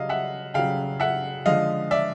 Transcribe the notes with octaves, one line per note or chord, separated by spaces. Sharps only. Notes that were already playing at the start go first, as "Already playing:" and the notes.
Already playing: C#3 F#3 D#5 F5
E5 F#5
C#3 F#3 F5 G5
E5 F#5
D3 F3 G#3 D#5 F5
D5 E5